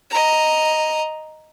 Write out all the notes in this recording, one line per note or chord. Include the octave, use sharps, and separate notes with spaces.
D#5 A#5